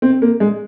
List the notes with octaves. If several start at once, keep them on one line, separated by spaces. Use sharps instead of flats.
C4
A#3
G#3